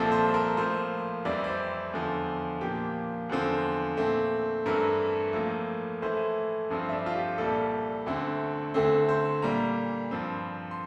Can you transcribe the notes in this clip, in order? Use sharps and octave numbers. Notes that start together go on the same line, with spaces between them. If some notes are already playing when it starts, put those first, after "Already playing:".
Already playing: C2 A#2 F3 C4 A4
C5
A#4
A2 F3 A#3 C5
F2 E3 G3 C4 D5
D5
C5
E2 D3 F3
A#2 F3 A#3 G4
E2 D3 F3 C4
A#2 A3 C4
G2 E3 A3 C4 A#4
A2 F3 A#3
A2 E3 A3 C5
G2 F3 A3 C4
E5
D5
F4
G4
C2 A#2 G3 A4
D2 D3 A3 C4
D2 D3 A3 C4
C5
A#2 G3 A#3 A#5
G2 F3 C4
C6